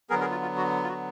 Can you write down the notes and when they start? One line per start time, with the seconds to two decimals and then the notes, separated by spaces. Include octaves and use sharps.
0.10 D3 F#3 B3 G#4 A#4
0.21 G#4 A#4
0.31 F4
0.42 F4
0.57 F#4
0.84 F4
0.88 F#4